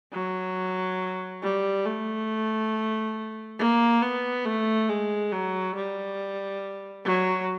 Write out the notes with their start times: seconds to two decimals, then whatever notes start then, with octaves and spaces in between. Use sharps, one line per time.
0.13 F#3
1.43 G3
1.85 A3
3.59 A#3
4.02 B3
4.45 A3
4.89 G#3
5.32 F#3
5.75 G3
7.05 F#3